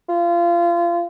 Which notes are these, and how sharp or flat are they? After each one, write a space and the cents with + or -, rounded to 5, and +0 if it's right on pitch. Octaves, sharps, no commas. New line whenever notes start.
F4 -25